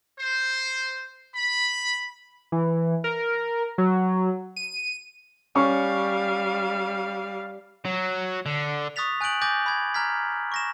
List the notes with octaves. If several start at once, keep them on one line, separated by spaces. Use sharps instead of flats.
C5
B5
E3
A#4
F#3
D#7
G3 C#4 F5 C#6
F#3
D3
C#6 D#6 F#6 A6 B6 F7
G#5 F#6 G6 D7 F#7
G#5 D6 G6 A6 A#6
B5 G#6
A#5 F6 G#6 B6
C#6 A#6 E7